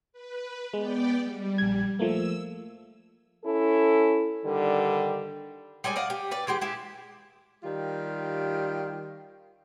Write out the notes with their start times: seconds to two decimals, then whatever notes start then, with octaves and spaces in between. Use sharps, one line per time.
0.12 B4
0.74 G#3 B3 D5 G5
1.19 G3
1.58 A#1 G#6
1.99 F3 A3 A#3 E6
3.44 C#4 E4 A4
4.45 G2 D3 D#3 G3
5.84 G3 G#3 D5 G#5
5.96 D5 D#5 F5 F#5
6.10 G4
6.31 B4 D5
6.47 E3 G#3 G4 G5
6.61 G#3 E4 G4
7.63 D#3 G3 F4 G4